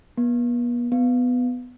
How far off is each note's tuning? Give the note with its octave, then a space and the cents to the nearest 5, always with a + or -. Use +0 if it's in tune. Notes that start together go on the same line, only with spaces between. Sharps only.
B3 -40
B3 +10